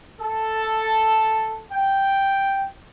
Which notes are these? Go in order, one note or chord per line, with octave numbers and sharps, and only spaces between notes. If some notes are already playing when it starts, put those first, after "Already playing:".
A4
G5